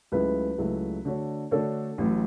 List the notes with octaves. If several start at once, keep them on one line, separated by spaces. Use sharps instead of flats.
C#2 C#3 F#3 A3 E4 B4
C#2 C#3 F#3 A3 E4
D3 A3 D4 F#4 C#5
D3 A3 D4 F#4 A4 C#5
A1 A2 F#3